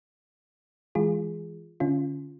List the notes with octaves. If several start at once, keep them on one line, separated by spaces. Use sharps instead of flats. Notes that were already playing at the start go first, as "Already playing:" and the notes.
E3 G#3 F4 G#4
D3 C#4 F4